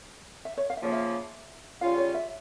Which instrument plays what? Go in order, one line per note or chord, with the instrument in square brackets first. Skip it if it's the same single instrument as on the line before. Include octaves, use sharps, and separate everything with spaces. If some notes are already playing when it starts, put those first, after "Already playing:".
[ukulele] E5
C#5
F5
E5
[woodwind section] C#3 F3 A#3 [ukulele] C#5
[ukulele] E5
[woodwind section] C#3 G3 C#4 F4 [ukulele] F5
[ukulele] C#5
E5